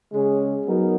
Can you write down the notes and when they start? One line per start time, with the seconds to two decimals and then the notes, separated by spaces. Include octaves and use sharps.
0.12 C#3 G#3 C#4 G#4
0.66 F#3 B3 D#4 A#4